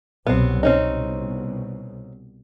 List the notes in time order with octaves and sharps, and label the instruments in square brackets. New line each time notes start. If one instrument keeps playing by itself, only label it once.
[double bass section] C2 B2 F#3 [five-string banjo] B3 C4
[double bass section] C2 B2 [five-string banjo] C4 C#4 D#4